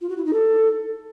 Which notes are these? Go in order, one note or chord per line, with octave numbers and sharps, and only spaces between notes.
F4
F#4
E4
D#4
A4